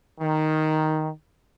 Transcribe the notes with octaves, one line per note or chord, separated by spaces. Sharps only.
D#3